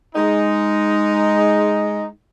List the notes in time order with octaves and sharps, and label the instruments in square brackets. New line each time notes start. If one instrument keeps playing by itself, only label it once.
[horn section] G#3 D#4